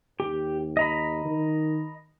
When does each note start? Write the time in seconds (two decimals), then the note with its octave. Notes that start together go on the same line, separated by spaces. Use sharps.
0.20 D#2 G4
0.77 D#5 A#5 B5
1.25 D#3